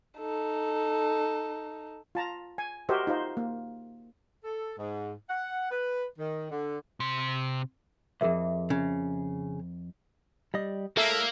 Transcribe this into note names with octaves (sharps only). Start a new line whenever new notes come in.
D#4 A4
F4 A5 A#5
G#5
F#4 G4 A#4 C5 D#5 E5
D#4 F4 C5
A#3
A4
G#2
F#5
B4
D#3
D3
C3 C6
C2 F2 G#4 A#4 E5
C#3
G3 D#5
A2 G#3 A#3 A4 E5